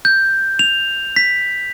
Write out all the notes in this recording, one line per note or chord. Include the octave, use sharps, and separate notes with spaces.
G6
F7
B6